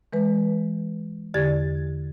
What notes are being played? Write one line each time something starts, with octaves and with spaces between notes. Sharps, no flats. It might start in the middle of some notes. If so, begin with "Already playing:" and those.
E3 G#3 B4
E2 D3 G4 D5 G#6 A6